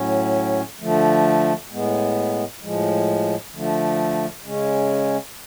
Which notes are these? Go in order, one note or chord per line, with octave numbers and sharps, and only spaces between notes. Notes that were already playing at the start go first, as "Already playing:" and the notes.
Already playing: A2 F#3 C#4
D3 F3 A3
A2 G#3 B3
A2 F3 G#3
D3 F3 A3
C#3 G#3 C#4